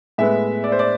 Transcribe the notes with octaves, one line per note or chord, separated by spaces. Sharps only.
A2 G#3 B3 E5
D5
C5
D5